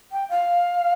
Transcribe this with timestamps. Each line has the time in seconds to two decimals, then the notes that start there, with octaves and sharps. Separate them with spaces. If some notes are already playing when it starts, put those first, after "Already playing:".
0.12 G5
0.29 F5